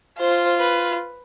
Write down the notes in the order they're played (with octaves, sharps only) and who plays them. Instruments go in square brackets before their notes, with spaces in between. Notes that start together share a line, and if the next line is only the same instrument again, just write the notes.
[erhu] F4 [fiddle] C5
[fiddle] B4